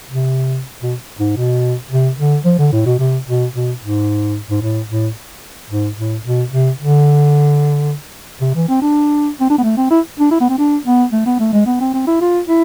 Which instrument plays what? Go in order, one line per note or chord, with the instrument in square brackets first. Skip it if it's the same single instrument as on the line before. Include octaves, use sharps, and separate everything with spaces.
[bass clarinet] C3
B2
G#2
B2
C3
D3
F3
D3
A2
B2
C3
B2
B2
G#2
G#2
A2
A2
G#2
A2
B2
C3
D3
C3
E3
C4
D4
C4
D4
B3
A3
C4
E4
D4
E4
B3
C4
D4
B3
A3
B3
A3
G#3
B3
C4
C4
E4
F4
E4